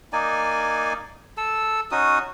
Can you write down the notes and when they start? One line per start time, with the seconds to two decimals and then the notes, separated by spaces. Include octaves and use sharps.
0.13 A#3 D#4 D5 G#5
1.37 A4 E6
1.91 C#4 D#4 F#4 D#6